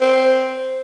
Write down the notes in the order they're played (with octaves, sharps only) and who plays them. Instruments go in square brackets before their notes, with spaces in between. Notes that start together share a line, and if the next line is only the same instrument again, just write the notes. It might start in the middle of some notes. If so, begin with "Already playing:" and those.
[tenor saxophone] C4